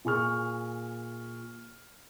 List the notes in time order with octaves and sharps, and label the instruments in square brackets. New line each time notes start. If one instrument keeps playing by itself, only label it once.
[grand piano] A#2 G#4 C#6 F6